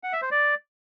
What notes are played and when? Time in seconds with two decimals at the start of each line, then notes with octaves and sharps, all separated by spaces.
0.04 F#5
0.13 E5
0.22 C5
0.31 D5